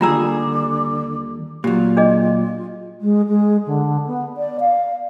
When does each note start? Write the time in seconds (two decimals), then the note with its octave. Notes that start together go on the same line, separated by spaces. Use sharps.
0.01 D#2 D3 G3 F4 G#4 A#5 E6
1.64 A#2 F#3 F4 G4
1.97 D4 G#4 D#5
3.01 G#3
3.28 G#3
3.66 D3
4.06 B3
4.37 D5
4.60 F5